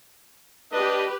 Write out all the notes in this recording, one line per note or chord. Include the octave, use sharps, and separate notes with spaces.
D4 G4 B4 D#5